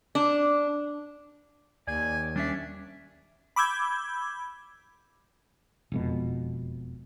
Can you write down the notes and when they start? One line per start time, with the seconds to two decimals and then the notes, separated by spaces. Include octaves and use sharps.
0.15 D4
1.87 D#2 D5 G#5
2.36 G3 C#4 D4 E5
3.56 B5 D6 E6 G6 G#6
5.92 E1 F2 B2